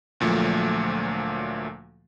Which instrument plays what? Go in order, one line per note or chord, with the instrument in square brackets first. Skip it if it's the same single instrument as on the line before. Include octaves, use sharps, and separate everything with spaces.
[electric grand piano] D2 A#2 F3 F#3 A3